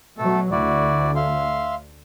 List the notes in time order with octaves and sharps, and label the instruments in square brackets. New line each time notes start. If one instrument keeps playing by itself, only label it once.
[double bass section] B2 F#3 [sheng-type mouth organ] A3 A4
[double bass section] D2 D3 [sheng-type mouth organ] E4 F#4 D5
[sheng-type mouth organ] E5 F5 C6